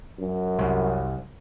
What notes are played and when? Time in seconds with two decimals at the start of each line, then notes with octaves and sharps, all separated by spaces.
0.19 F#2
0.59 C2